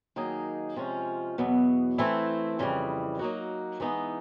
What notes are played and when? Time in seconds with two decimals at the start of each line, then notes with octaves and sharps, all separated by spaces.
0.16 D#3 F#3 A#3 D#4 G#4
0.76 C3 F3 G#3 C#4 F4
1.38 E2 B2 F#3 B3
1.98 E3 A3 C4 E4
2.59 F2 C#3 E3 G3
3.19 F#3 A#3 D#4 F#4
3.80 E3 G#3 B3 D#4